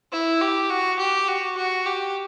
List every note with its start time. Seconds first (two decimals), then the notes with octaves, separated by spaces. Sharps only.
0.12 E4
0.41 G4
0.70 F#4
0.99 G4
1.28 F#4
1.57 F#4
1.86 G4